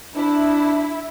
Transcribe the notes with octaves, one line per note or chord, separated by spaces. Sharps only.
D4 E4